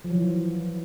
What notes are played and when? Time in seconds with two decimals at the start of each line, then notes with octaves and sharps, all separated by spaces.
0.04 F3
0.10 F#3
0.15 E3